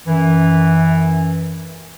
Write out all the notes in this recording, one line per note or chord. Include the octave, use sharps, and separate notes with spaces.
F#2 E3